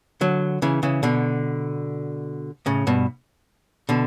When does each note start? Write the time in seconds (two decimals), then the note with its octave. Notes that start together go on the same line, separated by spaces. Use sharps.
0.21 D3 F#3
0.62 C#3 E3
0.83 C#3 E3
1.03 B2 D3
2.66 A2 C#3
2.87 G2 B2
3.89 B2 D3